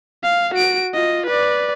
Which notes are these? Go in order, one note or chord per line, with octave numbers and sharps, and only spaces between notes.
F5
F#4 D7
F4 D#5
B4 D5